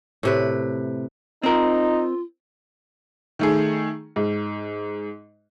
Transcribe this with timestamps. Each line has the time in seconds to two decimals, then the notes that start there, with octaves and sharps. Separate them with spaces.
0.23 A2 C3 B4
1.43 C4 D#4 F4 A#4
3.39 D#3 A3 G#4
4.16 G#2